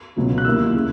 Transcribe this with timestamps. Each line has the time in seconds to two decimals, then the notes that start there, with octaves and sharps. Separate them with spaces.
0.16 C#2 B2 F#3 C#4
0.38 F#6
0.45 D#2 D#3 A#3 E4 E6
0.74 C#3 G#3